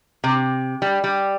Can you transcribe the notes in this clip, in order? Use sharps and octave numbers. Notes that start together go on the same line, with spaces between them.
C3
G3
G3